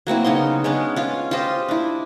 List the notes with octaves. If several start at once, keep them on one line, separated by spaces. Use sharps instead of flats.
F#3 A#3 C4 E4
C#3 B3 D#4 C6
G#3 B3 C#4 D4
C#4 F4
F4 G4 C5 D#5
D4 E4